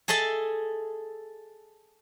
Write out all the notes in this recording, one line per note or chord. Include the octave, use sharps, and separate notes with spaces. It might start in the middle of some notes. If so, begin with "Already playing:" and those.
G#4 A4 D#5 E5 A5